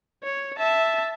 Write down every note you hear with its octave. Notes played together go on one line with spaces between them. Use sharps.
C#5
E5 A5